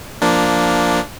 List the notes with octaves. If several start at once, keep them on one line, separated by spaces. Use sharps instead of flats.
F3 A#3 D4